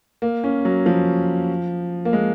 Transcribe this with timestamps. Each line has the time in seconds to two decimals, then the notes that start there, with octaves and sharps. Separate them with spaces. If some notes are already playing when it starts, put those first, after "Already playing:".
0.22 A#3
0.44 C#4
0.65 F#3
0.86 F3
2.05 A#3
2.13 G#3